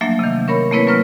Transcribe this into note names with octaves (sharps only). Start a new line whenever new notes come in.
F3 F#3 A3 A#3 D4 E5
C3 D#3
C#4 A#4 C#5 B5
A3 A#3 C4 E4 B4 C#5
F#3 A#3 C#4 B4 F6